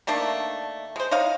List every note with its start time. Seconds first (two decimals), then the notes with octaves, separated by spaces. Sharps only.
0.07 D#3 A3 A#3 D4
0.96 G#3 C5
1.11 D#4 C#5 D#5 F5